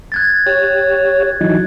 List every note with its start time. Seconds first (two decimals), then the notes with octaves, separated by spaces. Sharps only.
0.12 F#6 G#6 A6
0.46 G4 C#5
1.41 E3 F#3 D#4